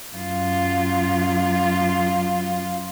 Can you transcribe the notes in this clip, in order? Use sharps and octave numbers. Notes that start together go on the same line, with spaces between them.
F#2 F4